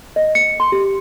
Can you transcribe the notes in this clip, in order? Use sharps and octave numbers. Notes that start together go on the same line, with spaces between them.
D#5
C#7
C6
G4